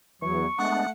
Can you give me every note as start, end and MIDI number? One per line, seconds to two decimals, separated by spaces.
0.22 0.46 40
0.22 0.45 52
0.22 0.46 54
0.22 0.75 85
0.59 0.86 56
0.59 0.91 57
0.59 0.86 59
0.59 0.86 62
0.59 0.90 78